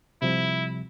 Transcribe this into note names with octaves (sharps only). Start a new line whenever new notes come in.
C3 F3 G3 E4